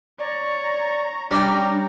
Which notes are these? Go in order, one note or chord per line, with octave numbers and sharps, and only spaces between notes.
C#5 D5 A#5
G3 C#4 D4 D5 G5 A#5